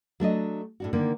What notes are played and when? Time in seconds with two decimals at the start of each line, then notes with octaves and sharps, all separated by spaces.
0.20 F#3 A3 D4 D#5
0.80 A2 D4 F#4
0.93 D3 D#3 A#3